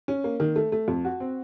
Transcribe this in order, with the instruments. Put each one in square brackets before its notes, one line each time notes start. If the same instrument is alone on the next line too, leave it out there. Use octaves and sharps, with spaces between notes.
[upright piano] C#4
A#3
D#3
A3
A3
F2
F#4
C4